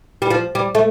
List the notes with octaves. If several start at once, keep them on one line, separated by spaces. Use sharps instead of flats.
G3
F3
G3
A3